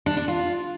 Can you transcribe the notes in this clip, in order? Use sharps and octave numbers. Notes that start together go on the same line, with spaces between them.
D4
D4
F4